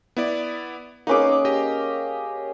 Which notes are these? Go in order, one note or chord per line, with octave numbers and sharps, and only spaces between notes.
B3 E4 D5
A#3 C#4 D#4 G#4 B4 D6
G4 D#5